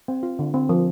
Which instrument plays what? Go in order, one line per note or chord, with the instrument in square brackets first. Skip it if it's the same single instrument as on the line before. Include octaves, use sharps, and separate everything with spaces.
[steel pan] C4
F4
D3
C4
F3